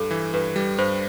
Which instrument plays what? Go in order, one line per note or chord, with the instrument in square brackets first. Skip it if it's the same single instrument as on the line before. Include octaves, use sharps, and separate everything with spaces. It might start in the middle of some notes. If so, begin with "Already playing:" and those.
Already playing: [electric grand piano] G2 [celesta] A4
[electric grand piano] E3
[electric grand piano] G2 [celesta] B4
[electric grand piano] G3
[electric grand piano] G2 [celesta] C5